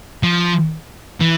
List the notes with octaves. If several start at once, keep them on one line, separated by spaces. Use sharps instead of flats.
F3
E3